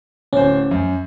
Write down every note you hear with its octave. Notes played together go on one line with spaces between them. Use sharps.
D1 C#4 C5
F#2